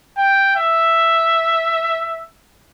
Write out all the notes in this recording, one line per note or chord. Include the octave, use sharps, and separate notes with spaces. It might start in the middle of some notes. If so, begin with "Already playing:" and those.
G5
E5